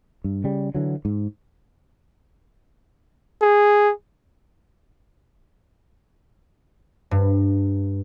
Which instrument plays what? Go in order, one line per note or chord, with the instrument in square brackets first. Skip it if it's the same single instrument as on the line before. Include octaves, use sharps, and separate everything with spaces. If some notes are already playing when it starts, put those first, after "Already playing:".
[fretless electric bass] G2
C#3 G3
D3 E3 F#3
G#2
[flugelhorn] G#4
[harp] G2